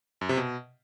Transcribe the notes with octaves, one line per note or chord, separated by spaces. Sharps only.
F#2
C3
B2